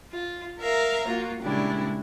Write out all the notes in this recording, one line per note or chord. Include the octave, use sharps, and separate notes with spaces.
F4
A#4 E5 F5 A#5
A#3 F4 F#4
A#2 C#3 G3 G#3 D4 E4